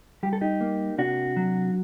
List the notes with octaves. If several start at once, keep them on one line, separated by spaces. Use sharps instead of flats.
G3 G4
A4
D#4 G4
A#3
C3 D4 F#4
F#3